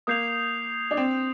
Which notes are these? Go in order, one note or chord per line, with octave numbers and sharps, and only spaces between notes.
A#3 D#6 G6 C7 F7
D4
C4